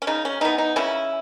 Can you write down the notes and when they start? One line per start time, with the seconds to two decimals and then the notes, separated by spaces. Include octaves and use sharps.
0.02 C#4
0.07 C#3 D#4
0.25 C#4
0.41 E3 B3 D#4
0.58 D#4
0.76 C#3 C#4 E4